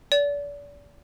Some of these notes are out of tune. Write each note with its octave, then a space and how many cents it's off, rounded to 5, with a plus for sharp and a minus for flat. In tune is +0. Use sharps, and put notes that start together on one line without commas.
D5 -35